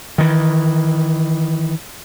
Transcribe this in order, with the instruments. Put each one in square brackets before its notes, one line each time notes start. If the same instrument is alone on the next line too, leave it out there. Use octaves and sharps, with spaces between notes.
[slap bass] D#3 E3